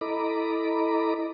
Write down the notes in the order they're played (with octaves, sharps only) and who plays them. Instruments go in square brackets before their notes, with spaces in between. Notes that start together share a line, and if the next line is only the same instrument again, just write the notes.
[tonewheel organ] E4 A4 D#5 A#5 B5 D6